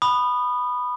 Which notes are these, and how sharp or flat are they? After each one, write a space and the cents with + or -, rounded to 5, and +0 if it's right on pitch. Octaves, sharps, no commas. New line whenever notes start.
B5 +0 D#6 -25